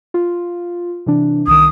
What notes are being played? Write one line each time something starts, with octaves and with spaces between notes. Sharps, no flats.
F4
C3 E3 D4
C2 D#3 D#6